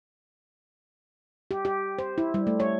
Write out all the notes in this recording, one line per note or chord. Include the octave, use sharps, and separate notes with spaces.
G4
G4
C5
E4
G3
A3
C#5